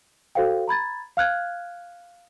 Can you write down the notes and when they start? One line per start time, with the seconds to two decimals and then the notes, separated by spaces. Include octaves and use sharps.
0.35 F#4 A4 C5 F5 G5
0.68 A#5 B5 G#6 A6
1.17 F5 F6 F#6 G#6